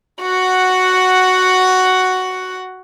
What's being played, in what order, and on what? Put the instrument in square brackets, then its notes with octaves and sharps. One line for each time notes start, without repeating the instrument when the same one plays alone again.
[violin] F#4 F#5